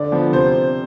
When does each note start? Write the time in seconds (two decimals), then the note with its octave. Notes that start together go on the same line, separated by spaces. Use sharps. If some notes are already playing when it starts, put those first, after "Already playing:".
Already playing: D3 D5
0.12 F3 B3
0.33 C3 C5